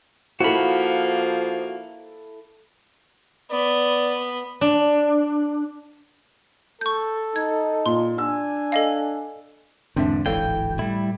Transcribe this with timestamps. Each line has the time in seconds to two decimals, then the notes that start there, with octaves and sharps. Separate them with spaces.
0.40 F3 A#3 E4 F#4 A4 B5
3.51 B3 D5
4.61 D4
6.81 A4 C#6 G6
7.36 D#4 G#6
7.86 A#2 C6
8.18 D4 G#5 E6
8.72 A4 D#5 F5
9.96 E2 G#2 D3 C4 D4 E5
10.26 D1 G#1 E3 A4 C#5 F5 G5
10.79 A2 G3 E4